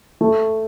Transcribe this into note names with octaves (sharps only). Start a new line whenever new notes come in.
A3